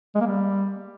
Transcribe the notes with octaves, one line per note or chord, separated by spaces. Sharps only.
G#3
A#3
G3